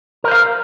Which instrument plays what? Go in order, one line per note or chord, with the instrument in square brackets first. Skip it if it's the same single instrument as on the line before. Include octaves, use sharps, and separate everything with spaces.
[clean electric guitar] A#4
C5
F5